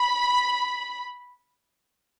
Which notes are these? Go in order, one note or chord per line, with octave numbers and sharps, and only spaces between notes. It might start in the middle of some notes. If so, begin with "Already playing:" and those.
Already playing: B5